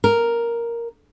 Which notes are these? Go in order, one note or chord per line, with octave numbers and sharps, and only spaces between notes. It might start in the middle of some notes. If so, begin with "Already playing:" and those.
A#4